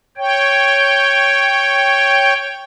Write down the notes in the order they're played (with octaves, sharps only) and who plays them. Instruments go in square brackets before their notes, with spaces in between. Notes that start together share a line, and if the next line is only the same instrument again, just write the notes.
[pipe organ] C#5 G5